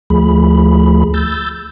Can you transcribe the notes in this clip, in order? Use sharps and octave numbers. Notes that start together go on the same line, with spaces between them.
D2 F3 A3 G#4 B5
E6 G6 A6